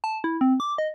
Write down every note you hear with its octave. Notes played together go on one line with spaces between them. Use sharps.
A5
E4
C4
D6
D#5